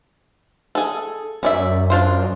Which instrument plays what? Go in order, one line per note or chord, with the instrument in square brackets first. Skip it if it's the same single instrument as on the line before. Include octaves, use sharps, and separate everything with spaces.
[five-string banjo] G#4 A4
[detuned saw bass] F#2 [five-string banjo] C#4 D5 E5
[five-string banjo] D4 F4 C5